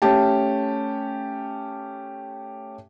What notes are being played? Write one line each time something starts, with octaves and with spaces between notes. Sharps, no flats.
A3 C#4 G4 A5